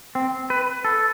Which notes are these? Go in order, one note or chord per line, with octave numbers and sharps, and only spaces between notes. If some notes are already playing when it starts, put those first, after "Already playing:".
C4
B4
A4